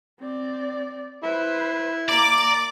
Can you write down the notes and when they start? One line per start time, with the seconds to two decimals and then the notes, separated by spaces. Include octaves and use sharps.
0.20 C4 D5
1.24 E4 B4 C5
2.09 A#3 D5 A#5 D6